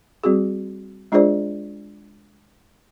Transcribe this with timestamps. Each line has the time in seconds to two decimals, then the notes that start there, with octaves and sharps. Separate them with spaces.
0.24 G3 C4 F#4 G#4
1.12 G#3 D4 F4 G#4 C5 D5